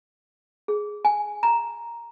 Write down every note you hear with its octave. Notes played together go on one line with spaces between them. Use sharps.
G#4
G#5
A#5